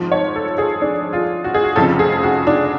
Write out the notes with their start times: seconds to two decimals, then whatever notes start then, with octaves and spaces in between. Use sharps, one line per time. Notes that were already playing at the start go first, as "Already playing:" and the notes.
Already playing: G#1 G#2 F3
0.12 C#5
0.36 A4
0.58 G#4
0.82 D4
1.13 F4
1.44 F#4
1.54 G#4
1.64 F#4
1.76 F1 F2 C#3 F3 A4
1.99 G#4
2.23 F#4
2.47 D4